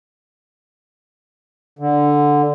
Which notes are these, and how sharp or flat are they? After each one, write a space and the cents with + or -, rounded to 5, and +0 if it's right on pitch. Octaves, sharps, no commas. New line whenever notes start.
D3 +0